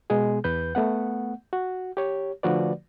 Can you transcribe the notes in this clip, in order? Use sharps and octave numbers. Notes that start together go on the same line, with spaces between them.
B2 G#3 B3 G#4
E2 B4 G6
A3 B3 F#5
F#4
G4 C#5
D3 F3 A3 F#4 B4 D5